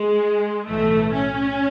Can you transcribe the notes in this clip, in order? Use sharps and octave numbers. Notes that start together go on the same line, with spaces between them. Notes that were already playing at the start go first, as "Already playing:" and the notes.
Already playing: G#3
B1 A2 E3 A3
C#4